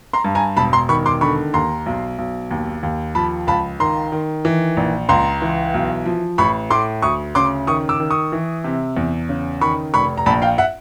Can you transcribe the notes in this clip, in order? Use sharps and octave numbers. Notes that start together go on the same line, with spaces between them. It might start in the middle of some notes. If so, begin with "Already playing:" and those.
A#5 C6
G2
G#5 A#5
E1 A5 B5
A#5 C6
D#3 B5 C#6
C6 D6
D3 B5 C#6
D#2 A#5 C6
B1
B1
D#2
D#2
F3 A5 B5
C#2 A5 B5
D#3 A#5 C6
D#3
E3
A#1
C#2 A#5 C6
E3
B1
F3
A1 B5 C#6
A2 C6 D6
D2 C#6 D#6
C#3 C6 D6
D#3 C#6 D#6
D6 E6
D#3
C#6 D#6
E3
C3
E2
C#3
D#3 B5 C#6
F1 B5 C#6
A#5
A#1 A5 B5
F5 G5
E5 F#5